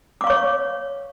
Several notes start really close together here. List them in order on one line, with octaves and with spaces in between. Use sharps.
D6 F5 C#6 C#5